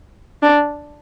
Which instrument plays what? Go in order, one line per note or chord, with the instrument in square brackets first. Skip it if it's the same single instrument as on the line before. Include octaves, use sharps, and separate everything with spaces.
[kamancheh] D4